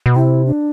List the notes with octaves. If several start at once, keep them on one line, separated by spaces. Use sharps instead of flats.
B2
C3 E4
D4